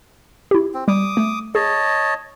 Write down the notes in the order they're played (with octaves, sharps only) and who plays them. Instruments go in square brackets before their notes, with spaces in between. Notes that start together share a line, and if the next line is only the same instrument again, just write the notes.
[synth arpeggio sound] E4 G4
[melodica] C4
[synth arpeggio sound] G3 [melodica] D6 D#6
[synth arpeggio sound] A3
[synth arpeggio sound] G#4 [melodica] C#5 D#5 A5